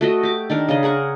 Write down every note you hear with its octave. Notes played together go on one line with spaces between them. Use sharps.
A3 F#4 D#5
G4 D6
D#3 D4 A#4
C#3 D4 D#5
G#4 A#4 F#5 C#6